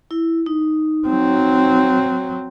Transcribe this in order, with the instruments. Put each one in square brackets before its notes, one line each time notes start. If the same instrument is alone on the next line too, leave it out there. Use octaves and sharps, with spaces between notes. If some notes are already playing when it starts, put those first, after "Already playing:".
[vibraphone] E4
D#4
[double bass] F#3 C4